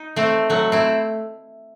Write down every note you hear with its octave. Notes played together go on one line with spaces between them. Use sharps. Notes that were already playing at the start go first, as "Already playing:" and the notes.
Already playing: D#4
A3 C4
F#3 A3
C4 E4